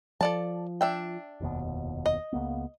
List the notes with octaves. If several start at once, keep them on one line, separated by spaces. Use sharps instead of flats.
F3 A4 D5 A5
D4 E5 G5
F1 D#2 B2
D#5
C#2 A#3 B3